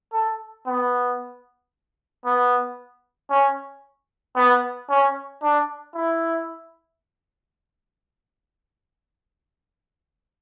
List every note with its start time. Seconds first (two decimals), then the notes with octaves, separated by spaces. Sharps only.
0.13 A4
0.67 B3
2.25 B3
3.30 C#4
4.36 B3
4.90 C#4
5.43 D4
5.95 E4